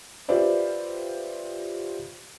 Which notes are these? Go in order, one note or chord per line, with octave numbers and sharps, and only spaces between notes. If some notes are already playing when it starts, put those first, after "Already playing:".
F4 G4 B4 C5 D5 E5